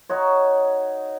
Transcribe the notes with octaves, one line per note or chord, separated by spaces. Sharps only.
D#4 F#4 C#5